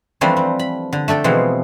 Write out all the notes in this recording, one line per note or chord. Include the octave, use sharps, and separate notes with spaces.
E3 F3 G3 A3 C4 D4
C4
B5
D3
A3 D4 A4 G5
B2 E3 F3 G#3 C4